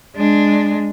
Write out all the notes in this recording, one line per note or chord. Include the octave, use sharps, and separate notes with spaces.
G#3 D4